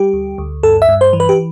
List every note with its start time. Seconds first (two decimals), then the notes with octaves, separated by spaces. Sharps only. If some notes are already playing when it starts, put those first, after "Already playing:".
Already playing: G3 G4
0.13 D2
0.38 D2
0.63 G2 A4
0.82 E5
0.89 G2
1.01 C5
1.13 E3
1.20 B4
1.29 G4